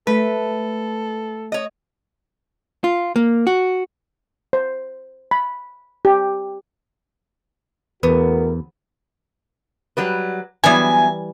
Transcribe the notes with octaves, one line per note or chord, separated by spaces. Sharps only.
A3 A4 B4
C#5 D#5
F4
A#3
F#4
C5
B5
G4
E2 A3 B3 F#4 A#4
F#3 G3 B4
E3 F#3 G3 B3 E4 G#5